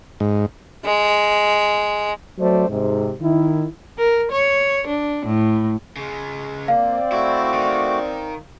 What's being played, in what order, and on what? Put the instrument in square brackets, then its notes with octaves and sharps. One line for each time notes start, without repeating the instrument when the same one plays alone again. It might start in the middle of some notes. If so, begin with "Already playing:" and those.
[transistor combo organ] G#2
[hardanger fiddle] G#3
[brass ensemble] F#3 A3 C4 C5 D5
G#2 C3
D#3 E4
[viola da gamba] A#4
C#5
D4
A2
[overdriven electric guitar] C#3 G#3
[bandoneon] A#3 [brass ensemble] C4 D5 [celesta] F5
[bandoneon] A3 F#4 D6 [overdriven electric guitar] E4
[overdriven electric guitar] D#3